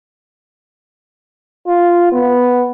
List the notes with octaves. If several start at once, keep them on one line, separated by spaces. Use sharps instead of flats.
F4
B3